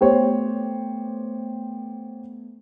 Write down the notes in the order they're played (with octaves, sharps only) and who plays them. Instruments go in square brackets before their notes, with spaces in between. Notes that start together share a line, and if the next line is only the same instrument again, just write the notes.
[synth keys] A3 B3 [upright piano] G4 C5 C#5